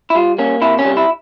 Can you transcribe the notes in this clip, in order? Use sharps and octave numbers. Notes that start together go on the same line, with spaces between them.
E4
G3 F4
A#3 C#4
C3 E4
C#4
G3
E4